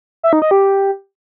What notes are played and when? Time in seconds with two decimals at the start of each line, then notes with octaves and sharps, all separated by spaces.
0.23 E5
0.33 D#4
0.42 D#5
0.51 G4